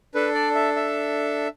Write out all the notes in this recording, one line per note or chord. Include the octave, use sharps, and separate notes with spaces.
D4 A4 B4
D5
E5
E5